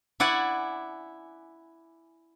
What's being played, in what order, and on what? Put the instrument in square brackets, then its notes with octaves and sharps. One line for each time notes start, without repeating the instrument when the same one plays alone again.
[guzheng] E4 D5 F#5 G#5